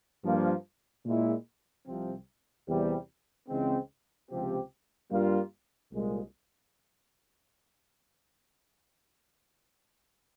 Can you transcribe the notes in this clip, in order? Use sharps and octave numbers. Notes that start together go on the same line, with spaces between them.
G2 F3 A#3
A#2 G#3 E4
C2 C3 F3 C4
E2 C3 E3 G3
C#2 C#3 E3 G#3 C4
C#2 C3 F3 C4 G4
G2 G3 A#3 F4
C2 A#2 G#3